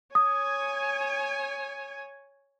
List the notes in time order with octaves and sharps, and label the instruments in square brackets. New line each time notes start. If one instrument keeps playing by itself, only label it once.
[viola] C#5 G#5 [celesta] D#6